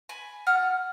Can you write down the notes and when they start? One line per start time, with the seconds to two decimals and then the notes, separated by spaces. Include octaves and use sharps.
0.09 G#5 B5
0.46 F4 F#5 F6